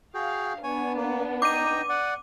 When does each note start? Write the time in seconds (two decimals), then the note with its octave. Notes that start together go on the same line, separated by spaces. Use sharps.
0.14 F#4 G#4 F5 G5
0.63 B3 D4 C#5 G#5
0.96 A#3
1.42 D#4 G5 A#5 D6 D#7
1.89 D5 F#5